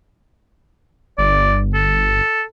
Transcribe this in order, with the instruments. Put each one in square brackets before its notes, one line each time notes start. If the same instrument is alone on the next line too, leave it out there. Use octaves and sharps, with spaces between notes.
[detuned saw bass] G1 [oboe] D5
[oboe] A4